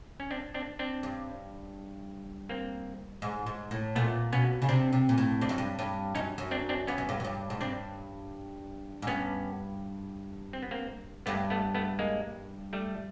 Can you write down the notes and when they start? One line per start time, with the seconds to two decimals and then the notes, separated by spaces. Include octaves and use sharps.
0.20 C#4
0.31 C4 D4
0.54 C4 D4
0.79 C4 D4
1.03 G2
2.49 A#3 C4
3.22 G#2
3.46 G#2
3.71 A2
3.95 A#2 A3 B3
4.33 B2 B3 C#4
4.62 C#3
4.69 C3 C4 D4
4.93 C3
5.09 A#2
5.18 A2
5.41 G2 C4 D4
5.49 F#2
5.58 G2
5.79 G2
6.15 F#2 C#4 D#4
6.38 F#2
6.51 C4 D4
6.69 C4 D4
6.87 G2 B3 C#4
6.98 F#2
7.09 G2
7.20 F#2
7.24 G2
7.50 G#2
7.61 G2 C4 D4
9.02 G#2
9.07 G2 B3 C#4
10.53 C4
10.63 B3
10.71 A#3 C4
11.26 G2 A3 B3
11.50 A3 B3
11.75 A3 B3
11.99 G#3 A#3
12.73 G3 A3